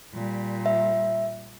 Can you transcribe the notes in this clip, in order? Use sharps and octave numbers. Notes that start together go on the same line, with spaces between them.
A#2 G3
E5